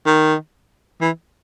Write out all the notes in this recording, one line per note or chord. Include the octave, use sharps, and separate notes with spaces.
D#3
E3